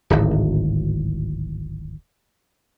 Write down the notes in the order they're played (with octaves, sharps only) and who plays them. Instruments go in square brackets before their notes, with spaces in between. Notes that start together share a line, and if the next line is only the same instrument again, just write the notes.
[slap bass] D1 G#1